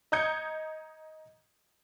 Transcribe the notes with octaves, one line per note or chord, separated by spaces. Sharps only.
D#5 A#5 D#6 G6 G#6 C#7